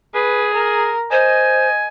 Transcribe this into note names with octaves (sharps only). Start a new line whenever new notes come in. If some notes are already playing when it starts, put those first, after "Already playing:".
G#4 B4
A#4
C5 D#5 G#5